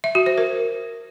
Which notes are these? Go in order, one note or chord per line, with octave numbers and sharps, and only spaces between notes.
E5
F#4
C5
A#4